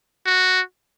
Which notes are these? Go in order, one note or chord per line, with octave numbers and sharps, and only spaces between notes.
F#4